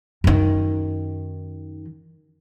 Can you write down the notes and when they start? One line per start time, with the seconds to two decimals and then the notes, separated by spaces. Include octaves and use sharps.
0.24 F#2 D#3